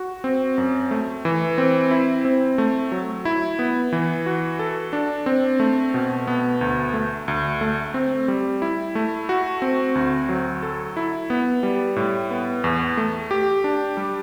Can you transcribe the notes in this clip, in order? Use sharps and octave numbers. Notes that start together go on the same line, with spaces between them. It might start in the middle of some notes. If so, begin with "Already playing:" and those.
Already playing: F#4
C4
F#2
A3
E3
C4
E4
C4
A3
F#3
E4
B3
E3
F#4
A4
D4
C4
A3
B2
B3
D2
A3
D2
A3
C4
G3
E4
A3
F#4
C4
D2
F#3
A4
E4
B3
G3
A2
B3
E2
A3
G4
D4
G3